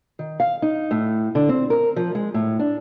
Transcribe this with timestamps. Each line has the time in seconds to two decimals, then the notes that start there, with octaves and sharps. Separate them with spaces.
0.19 D#3
0.40 F5
0.62 D#4
0.91 A2
1.35 D3
1.49 C4
1.70 A#4
1.96 F3
2.15 G#3
2.34 A2
2.59 D4